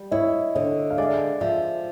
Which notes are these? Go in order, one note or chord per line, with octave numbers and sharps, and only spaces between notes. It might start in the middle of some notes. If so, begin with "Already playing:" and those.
Already playing: G3
E4 C#5 D#5
D3 C#5 D#5
F5
G#3 D5 E5
F3 D5 E5